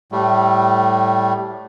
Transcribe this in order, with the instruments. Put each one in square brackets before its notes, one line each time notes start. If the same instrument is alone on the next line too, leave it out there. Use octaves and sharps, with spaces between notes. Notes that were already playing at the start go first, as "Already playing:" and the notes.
[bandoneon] A2 G3 A3